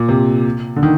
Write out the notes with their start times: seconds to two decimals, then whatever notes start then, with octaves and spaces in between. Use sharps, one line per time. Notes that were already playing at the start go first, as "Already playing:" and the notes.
Already playing: A#2
0.08 C3
0.76 D3
0.83 D#3